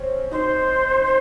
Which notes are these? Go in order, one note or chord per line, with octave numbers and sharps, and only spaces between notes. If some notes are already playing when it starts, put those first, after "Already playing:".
Already playing: C4 C#4
D#4 C5